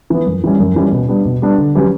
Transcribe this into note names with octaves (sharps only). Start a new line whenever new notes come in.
E3 B3
F#2
E3 G3 C#4
F#2
E3 G3 C#4
B2
G3 B3 D4
B2
G3 B3 D4
D3
F#3 C#4 G4 B4